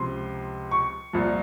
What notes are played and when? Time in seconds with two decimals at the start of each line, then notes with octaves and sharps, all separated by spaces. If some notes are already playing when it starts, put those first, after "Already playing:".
Already playing: C#2 C3 F3 C6
0.71 C#6
1.13 C2 A#2 F3